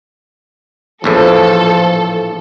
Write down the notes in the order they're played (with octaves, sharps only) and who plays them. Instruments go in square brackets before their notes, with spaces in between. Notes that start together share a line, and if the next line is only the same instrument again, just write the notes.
[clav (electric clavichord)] A#1 E2 A2 [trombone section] F3 [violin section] A4